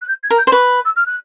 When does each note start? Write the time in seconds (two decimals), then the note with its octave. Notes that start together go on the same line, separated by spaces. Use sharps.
0.02 F#6
0.08 G6
0.24 G#6
0.31 A#4
0.38 G6
0.47 C5
0.52 B4 C#6
0.85 E6
0.96 F6
1.06 F#6